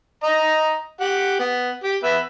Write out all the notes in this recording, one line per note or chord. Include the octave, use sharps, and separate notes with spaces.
D#5 A#5
G4 F#5
B3
G4
B3 B4 E5